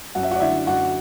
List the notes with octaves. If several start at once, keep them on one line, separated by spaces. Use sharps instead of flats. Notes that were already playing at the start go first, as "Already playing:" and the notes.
F#2 F#5
E5
F#4 F#5
D5
D3 E4 E5
F#2 F#4 F#5